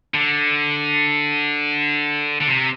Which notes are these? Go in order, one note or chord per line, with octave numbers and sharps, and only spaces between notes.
D3
D3
C3